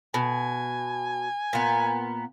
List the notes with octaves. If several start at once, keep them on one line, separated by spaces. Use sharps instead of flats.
B2 G#5
A#2 B3